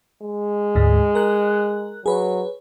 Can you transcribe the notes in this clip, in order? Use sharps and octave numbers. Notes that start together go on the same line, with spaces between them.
G#3
D2 G#2
A#4 F#6
F#3 G#4 B4 C#5